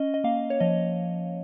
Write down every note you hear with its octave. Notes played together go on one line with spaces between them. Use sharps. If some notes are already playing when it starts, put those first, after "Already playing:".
Already playing: C#4 D#5
D#5
A#3 F5
C#5
F3 D#5